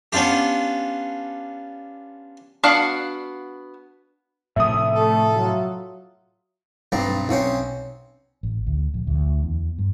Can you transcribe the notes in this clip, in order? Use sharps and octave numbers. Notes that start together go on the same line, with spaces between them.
B3 C#4 D4 F4 G4
B3 D4 F#4 F5 F#5
A2 C3 F3 E5 D#6
A3 A4
F#3 F4
B1 G2 G3 C4 A#5
B1 C4 C#4 G5
A1
D2
A#1
D2
E2
G2